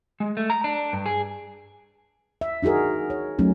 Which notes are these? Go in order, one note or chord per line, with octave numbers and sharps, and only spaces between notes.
G#3
A3
A#5
D4
G2
G#4
E5
D4 D#4 F#4 G#4 A#4
C#5
F#3 A3 C#4 D#4